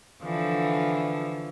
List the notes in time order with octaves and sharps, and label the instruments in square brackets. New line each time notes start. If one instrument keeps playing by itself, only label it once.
[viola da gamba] D3 E3 F3